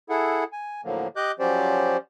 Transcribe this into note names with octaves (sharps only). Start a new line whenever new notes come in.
E4 G#4 A4 F#5
G#5
A2 D3 F3 F#3 A#3
G4 D#5 D6 F#6 G6
F3 F#3 C#4 G4 C5 D5